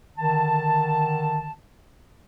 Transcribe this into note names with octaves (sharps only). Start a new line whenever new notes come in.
D3 D#3 A5